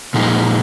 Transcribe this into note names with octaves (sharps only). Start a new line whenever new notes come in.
A#2 F3 G#3 D#4